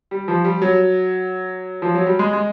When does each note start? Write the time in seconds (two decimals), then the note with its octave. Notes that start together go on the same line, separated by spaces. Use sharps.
0.11 G3
0.28 F3
0.44 G3
0.62 F#3
1.82 F3
1.95 F#3
2.06 G3
2.19 G#3
2.33 G#3